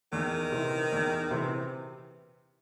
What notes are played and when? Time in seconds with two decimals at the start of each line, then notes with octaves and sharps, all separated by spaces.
0.12 E2 D#3
0.52 C3 E3
0.92 E2
1.31 C3 E3